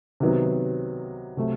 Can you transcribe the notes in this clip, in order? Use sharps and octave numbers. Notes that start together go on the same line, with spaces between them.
C3 D#3 F#3 B3
C3 F#3 A3